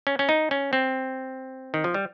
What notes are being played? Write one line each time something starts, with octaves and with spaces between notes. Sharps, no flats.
C#4
C#4
D#4
C#4
C4
D#3
F3
G3